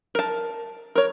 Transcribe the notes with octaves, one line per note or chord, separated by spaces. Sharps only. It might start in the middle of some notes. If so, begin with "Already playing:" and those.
A#4 A5
A#4 C#5